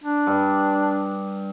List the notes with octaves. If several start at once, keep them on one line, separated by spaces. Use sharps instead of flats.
D4
G2